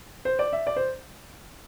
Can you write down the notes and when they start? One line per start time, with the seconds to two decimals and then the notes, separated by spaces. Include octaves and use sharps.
0.25 C5
0.39 D5
0.53 E5
0.67 D5
0.76 C5